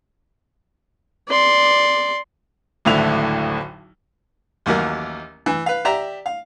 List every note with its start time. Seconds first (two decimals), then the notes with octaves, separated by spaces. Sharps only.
1.28 D5 C6
2.85 D1 G#1 A2 D3 E4 F7
4.66 A1 D#2 F#3 A#4
5.46 E3
5.66 B4 F5
5.85 G4 D5 E5 A#5
6.26 F5